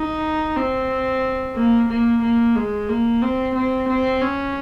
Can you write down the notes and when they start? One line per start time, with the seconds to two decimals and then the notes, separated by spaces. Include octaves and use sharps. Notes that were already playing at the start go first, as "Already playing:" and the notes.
Already playing: D#4
0.56 C4
1.56 A#3
1.89 A#3
2.22 A#3
2.55 G#3
2.89 A#3
3.22 C4
3.55 C4
3.88 C4
4.21 C#4